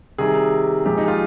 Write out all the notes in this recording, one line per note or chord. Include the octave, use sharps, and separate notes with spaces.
C3 D#3 G3 G#4
A#2 F3 G#3 G4
D#4
F4